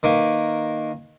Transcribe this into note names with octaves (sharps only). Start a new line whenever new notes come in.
D#3 A#3 B4